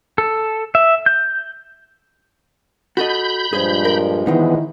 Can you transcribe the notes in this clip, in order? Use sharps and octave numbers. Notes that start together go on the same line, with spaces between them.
A4
E5
G6
F#4 A4 D#5 B5 G6
G2 A#2 F3 G#3 G#4 C5
A#4
D#3 E3 B3 D#4 E4